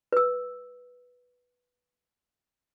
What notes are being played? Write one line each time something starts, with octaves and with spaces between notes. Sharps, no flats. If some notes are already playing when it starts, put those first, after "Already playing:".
B4 E6